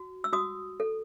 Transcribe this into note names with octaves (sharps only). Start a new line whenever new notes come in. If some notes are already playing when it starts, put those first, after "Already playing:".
Already playing: F#4
E6
F#4 D#6
A4